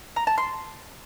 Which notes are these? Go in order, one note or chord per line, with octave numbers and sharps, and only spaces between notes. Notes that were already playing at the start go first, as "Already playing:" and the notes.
A#5
A5
C6